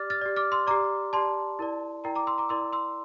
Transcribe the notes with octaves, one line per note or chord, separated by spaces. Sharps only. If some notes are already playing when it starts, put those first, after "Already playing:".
Already playing: G4 D5 D6 F6 A6
F6 A6
G4 D5
D6 F6
C6 E6
G4 D5 A#5 D6
G4 D5 A5 C6
E4 A#4 D5
E4 A#4 D5 G5 A#5
A#5 D6
C6 E6
A#5 D6
E4 A#4 D5 C6 E6
C6 E6